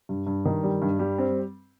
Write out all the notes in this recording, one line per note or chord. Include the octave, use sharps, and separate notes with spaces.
G2
G2
D#3
G3
G2
G3
C4